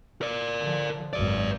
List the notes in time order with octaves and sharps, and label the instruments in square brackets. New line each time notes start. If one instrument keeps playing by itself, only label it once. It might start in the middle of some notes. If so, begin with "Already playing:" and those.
[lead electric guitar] A#4 D5
[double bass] D3 F3
[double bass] G#1 F#2 [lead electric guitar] B4 D5